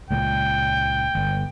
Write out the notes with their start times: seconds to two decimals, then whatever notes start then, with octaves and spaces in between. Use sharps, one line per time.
0.11 C#2 A#2 G5
1.15 G1